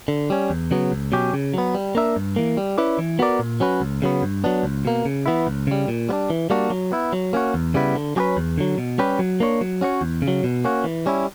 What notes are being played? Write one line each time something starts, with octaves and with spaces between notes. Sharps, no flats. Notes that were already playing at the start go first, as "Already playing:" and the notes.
D3
G3 C#4
E2
C#3 F#3 B3
C#2
B2 F#3 C#4 G4
C#3
F#3 B3
G3
A#3 D4 A#4 E5
G2
E3 A#3
G3
C#4 E4 B4 D5
E3
B3 F#4 A#4 D5
A#2
F#3 C#4 F#4 B4
C#2
C#3 F#3 B3
G2
F#3 B3 D4
C#2
B2 A#3
C#3
E3 B3 E4
C#2
C#3 G3
A#2
G3 B3 D4
E3
G3 A#3 D4 F#4
F#3
B3 E4
F#3
A#3 C#4 F#4
E2
C#3 G3 B3 E4
D3
F#3 C#4 G4 B4
E2
D3 F#3
B2
G3 C#4 G4 B4
F#3
A#3 D4 A#4 C#5
F#3
C#4 F#4 C#5
E2
C#3
F#3
B2
A#3 C#4 F#4
E3
G3 C#4 E4